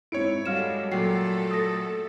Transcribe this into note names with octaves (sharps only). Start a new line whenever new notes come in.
G#2 C4 E4 C#5 C#7 D7
G3 G#3 F#4 A4 F5 F6 E7
A#2 F#3 A3 A4 G5 C7
D#6 A#6